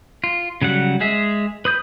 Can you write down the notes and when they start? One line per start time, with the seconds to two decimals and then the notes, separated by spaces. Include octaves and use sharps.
0.24 F4
0.62 C#3 F#3 G3 F#5
1.00 G#3 G#4 E5
1.65 B4 D#6 G6